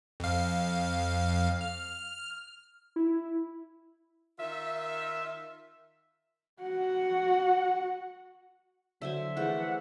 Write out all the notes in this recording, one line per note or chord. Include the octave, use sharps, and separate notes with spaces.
F2 F5
F6
E4
D#3 F4 E5
F#4 F#5
D3 F#3 C5 E5 G#5
E3 F3 A3 G#4 F#5